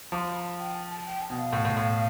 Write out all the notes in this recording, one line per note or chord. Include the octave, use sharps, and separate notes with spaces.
F3 C6 D6
B5
A5
G5
A5
A5
G5
A5
B2
F5
A2
A2
A2